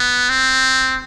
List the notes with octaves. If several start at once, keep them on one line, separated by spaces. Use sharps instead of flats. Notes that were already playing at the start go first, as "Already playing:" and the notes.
Already playing: B3
C4